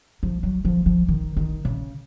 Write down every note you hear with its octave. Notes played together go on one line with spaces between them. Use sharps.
F3
F#3
F3
F3
D#3
D#3
C#3